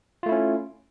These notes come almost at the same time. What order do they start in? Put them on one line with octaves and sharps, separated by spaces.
F4 A3 E4 C#4